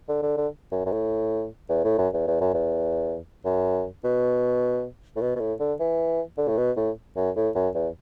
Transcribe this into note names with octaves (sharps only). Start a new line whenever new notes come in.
D3
D3
D3
F#2
F#2
A2
E2
A2
F#2
E2
E2
F#2
E2
F#2
B2
A2
B2
B2
A2
D3
E3
D3
A2
B2
A2
F#2
A2
F#2
E2